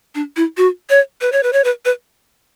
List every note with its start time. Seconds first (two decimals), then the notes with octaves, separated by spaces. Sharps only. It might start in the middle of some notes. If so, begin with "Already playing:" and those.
0.15 D4
0.36 E4
0.57 F#4
0.90 C#5
1.21 B4
1.32 C#5
1.43 B4
1.53 C#5
1.64 B4
1.85 B4